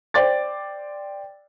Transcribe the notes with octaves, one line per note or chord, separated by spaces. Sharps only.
C5 D5 G5 D6 A6